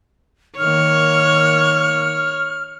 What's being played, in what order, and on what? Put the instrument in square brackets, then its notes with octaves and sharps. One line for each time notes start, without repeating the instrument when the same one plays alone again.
[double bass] D#3 A#3 [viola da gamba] C#5 [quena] F6